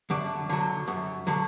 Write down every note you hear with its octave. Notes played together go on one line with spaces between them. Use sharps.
F#2 D3 D4
D3 F#3
F#2
D3 F#3